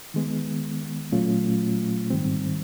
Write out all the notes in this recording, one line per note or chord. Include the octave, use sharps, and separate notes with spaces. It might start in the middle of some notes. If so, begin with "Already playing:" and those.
D#3 G#3 B3
A#2 F#3 A3 C#4 F4
G#2 D#3 G3 C4